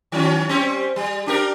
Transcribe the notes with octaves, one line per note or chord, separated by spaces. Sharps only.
D#3 F#3 C#4
G3 C4 C#4
G3
D4 G4 A#4